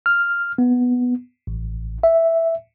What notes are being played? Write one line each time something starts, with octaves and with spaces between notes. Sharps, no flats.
F6
B3
A1
E5